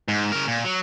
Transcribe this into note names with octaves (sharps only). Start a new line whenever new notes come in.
G#2
C#3 A#4
A#2
F#3